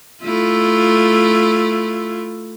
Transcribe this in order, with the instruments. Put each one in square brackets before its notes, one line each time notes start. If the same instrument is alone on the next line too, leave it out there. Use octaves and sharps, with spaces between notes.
[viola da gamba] A3 E4 F4